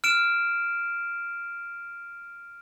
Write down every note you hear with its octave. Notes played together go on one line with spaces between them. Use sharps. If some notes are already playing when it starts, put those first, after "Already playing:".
F6 D7 E7